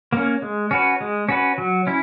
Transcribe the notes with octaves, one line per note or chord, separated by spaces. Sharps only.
A#3 C#4
G#3
C#4 F#4 B4
G#3
C#4 F#4 B4
F#3
C#4 E4